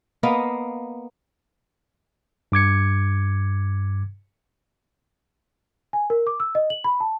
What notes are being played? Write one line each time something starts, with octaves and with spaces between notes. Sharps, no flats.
A#3 B3 D#5 F5
G2 D6 G#6 C#7
G#5
A#4
D6
E6
D#5
F#7
B5
A5